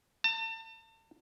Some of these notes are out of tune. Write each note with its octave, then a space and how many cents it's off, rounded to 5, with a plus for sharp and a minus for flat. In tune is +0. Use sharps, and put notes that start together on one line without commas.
A5 +40